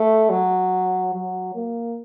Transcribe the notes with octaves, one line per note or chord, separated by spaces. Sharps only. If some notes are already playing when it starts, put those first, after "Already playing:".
Already playing: A3
F#3
F#3
A#3